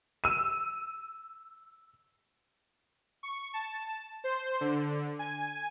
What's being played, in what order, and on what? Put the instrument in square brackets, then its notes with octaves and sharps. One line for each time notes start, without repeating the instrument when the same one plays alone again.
[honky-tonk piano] E6 D#7
[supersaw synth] C#6
A5
C5
D3
G#5